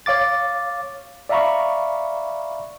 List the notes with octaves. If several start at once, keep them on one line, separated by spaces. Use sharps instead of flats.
C#5 F5 D6 A6
D5 E5 F5 A#5 B5 C#6